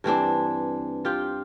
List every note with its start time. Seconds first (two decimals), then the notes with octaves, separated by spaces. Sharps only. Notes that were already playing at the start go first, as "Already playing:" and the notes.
0.04 G2 E3 C4 D4
1.05 F4 G4 G5